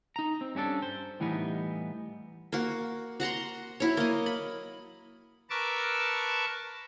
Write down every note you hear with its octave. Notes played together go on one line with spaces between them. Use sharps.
D#4 A#5
C4
G2 C#4 D4 A4
C5
A2 E3 G3 B3 D#4
A#3 F#4
F#4 F#5 A#5 C6
F#3 E4 C#5
A#3 D#5
B5
A#4 B4 A5 C#6 D6 E6